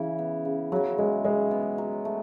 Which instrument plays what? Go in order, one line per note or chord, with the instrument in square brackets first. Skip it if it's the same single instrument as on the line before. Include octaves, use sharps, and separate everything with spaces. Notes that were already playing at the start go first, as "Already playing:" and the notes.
Already playing: [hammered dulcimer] C#3 E4 [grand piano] E3
[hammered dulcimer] B3
C#3
[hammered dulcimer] C#3 [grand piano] F#3
[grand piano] G#3 [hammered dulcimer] E4
[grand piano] G#3 [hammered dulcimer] B3
[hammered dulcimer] B3
F#3
A3